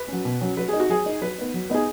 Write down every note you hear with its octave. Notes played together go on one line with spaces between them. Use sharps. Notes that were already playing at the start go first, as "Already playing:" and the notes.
Already playing: B4
F#3 C#4
B2
F#3 C#4
F#3 B4
D#4 G#4
F#4
F#3 G#4
D#4
F#3 B4
B3 D#4
F#3
B3 D#4 G#4